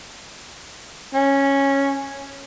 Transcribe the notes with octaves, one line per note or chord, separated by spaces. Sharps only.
C#4